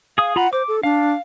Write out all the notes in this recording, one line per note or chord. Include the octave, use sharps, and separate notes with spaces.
G#4 F5 D#6
F4 F#5 A#5 B5
C5 D6
A4
D4 F5